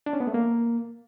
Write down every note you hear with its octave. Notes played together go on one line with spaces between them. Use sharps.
D4
C#4
B3
A3
A#3